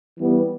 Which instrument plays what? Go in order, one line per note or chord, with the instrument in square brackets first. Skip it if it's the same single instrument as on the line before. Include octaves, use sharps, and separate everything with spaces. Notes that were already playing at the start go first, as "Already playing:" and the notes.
[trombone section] E3 G3 B3